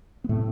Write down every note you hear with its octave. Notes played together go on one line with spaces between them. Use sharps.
B3
A2 C3 A3